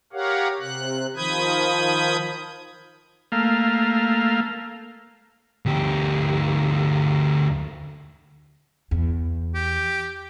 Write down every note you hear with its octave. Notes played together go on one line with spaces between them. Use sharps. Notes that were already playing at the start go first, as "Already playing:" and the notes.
G4 A#4 C#5 F5 F#5
C3 F#6
D#3 F3 B5 D#6 G6 G#6
A3 A#3 F5
D2 G4
E2
G4